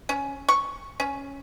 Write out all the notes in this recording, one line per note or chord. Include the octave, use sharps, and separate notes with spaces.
C#4
C#6
C#4